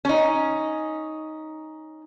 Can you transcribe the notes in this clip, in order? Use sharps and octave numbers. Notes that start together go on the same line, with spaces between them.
C#4 D#4